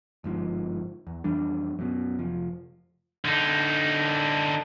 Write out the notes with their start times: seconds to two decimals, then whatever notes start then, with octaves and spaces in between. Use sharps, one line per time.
0.24 G1 G#2 F3
1.07 E2
1.24 F2 E3 G3 D4
1.79 F#2 B2
2.19 F1 F3
3.25 D3 D#4